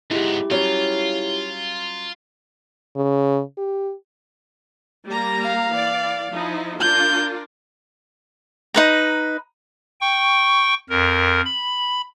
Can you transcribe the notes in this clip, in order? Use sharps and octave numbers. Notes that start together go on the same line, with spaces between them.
G#2 G#3 B3 E4 G4
F#3 G3 C#4 F4 C#5
C#3
G4
G3 A#3 A#5
F5
E3 D5
F3 D#4 E4
D4 F4 A#4 G6
D#4 B4 A#5
G5 C#6
F2 A#4
B5